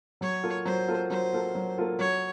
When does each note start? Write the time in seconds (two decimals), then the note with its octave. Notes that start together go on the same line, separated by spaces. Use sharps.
0.21 F#3 C#5
0.43 A#3 F4 A4
0.65 F#3 C5
0.88 A#3 F4 A4
1.10 F#3 C5
1.33 A#3 F4 A4
1.55 F#3
1.78 A#3 F4 A4
1.99 F#3 C#5